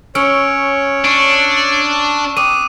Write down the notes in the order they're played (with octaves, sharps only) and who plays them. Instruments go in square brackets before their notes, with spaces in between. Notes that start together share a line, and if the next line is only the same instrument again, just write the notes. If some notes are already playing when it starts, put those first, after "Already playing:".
[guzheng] C#4 [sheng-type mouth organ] C#5 [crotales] E6 F6 D7
[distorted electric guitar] D4 [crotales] C#6 D#7
[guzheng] C4 [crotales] D6 D#6 D#7 [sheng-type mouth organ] F#6